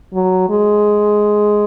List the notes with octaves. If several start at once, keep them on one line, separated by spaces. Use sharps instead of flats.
F#3
G#3